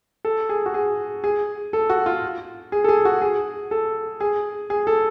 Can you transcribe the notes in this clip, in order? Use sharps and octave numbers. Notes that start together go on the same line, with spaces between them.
A4
G#4
F#4
G#4
G#4
A4
F#4
F4
G#4
A4
G#4
F#4
G#4
A4
G#4
G#4
A4